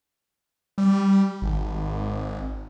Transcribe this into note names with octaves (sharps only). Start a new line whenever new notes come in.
G3
G#1